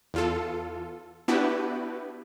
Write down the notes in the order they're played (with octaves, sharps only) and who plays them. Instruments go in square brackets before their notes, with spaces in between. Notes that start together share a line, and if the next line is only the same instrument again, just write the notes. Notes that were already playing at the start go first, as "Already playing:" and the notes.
[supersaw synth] E2 F4 A4
B3 D4 E4 F#4 G4 B4